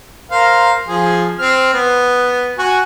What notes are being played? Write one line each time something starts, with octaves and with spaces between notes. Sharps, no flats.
A#4 C5 F5
F3 G#4
C4 F6
B3
F#4 G#5